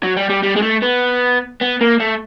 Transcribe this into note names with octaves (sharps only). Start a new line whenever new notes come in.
F#3
G3
G3
G3
G#3
A3
B3
B3
A#3
A3